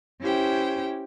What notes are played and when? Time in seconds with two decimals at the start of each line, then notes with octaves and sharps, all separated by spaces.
0.21 C#4 E4 G4 C5 G5